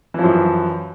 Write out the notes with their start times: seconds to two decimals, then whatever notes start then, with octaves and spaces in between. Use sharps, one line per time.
0.14 E3
0.19 F3
0.23 F#2